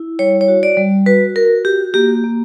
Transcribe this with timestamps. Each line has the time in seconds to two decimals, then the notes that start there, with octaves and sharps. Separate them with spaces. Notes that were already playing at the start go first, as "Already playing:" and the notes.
Already playing: E4
0.19 G3 C#5
0.41 C#5
0.48 F#4
0.63 D5
0.77 G3
1.06 F#4 B4
1.36 F#4 A#4
1.65 F#4 G4
1.94 A#3 G4
2.24 A#3